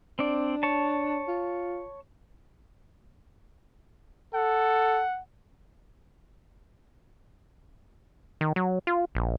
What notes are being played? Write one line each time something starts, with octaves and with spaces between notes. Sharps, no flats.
C4 D4 D5
C#5 A5
F4
A4 F#5
D#3
F#3
F4
A#1